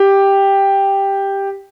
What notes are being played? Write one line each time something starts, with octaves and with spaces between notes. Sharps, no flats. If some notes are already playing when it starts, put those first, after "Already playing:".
Already playing: G4